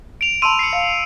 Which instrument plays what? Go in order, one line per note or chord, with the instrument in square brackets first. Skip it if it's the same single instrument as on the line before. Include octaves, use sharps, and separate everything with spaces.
[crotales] D7 F7
[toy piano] A5 B5 C6 [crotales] E6 D#7
[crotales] C7 C#7
[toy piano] F5